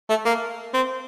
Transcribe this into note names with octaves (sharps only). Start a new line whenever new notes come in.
A3
A#3
C4